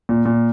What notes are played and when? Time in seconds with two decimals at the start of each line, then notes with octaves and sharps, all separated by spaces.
0.09 A#2
0.25 A#2